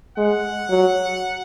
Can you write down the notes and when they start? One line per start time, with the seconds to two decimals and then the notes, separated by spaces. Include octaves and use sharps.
0.17 G#3 F#5
0.70 F#3